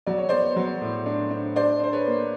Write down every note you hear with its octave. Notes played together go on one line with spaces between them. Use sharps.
F#3 D5
C#5
B3 C5 D5
F#3
A2
D4
D4
D4 C5 D5
D4 C5
B4 C#5
A#3